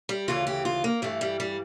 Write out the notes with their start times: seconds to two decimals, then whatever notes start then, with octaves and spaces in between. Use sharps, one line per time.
0.09 G3
0.28 D2 C#3 E3 F4
0.47 G4
0.65 F4
0.84 A#3
1.02 G2 E3 A3
1.21 G3
1.40 G3